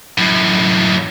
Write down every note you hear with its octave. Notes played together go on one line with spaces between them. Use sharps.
F#2 A2